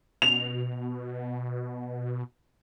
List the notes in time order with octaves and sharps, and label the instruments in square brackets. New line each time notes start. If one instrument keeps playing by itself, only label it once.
[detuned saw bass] B2 [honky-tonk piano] F7